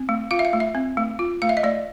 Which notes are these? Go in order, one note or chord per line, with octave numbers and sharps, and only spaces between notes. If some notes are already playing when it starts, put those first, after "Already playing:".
Already playing: C4
A3
F4 F5
E5
F5
A3
E5
C4
A3
F4
A3 F5
E5
D#5
A3 D5